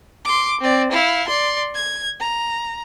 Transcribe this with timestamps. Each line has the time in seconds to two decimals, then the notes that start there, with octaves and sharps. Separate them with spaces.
0.25 C6 D6
0.61 C4 D5
0.92 E4 F5
1.28 D5 C6
1.75 G#6
2.20 A#5